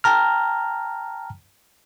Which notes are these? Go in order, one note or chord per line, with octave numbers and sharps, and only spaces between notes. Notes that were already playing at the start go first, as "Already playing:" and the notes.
G5 A5 A#5 F6